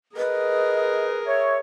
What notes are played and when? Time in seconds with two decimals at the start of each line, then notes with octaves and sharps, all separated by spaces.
0.17 G#4 A#4 B4 D#5
1.26 C#5 E5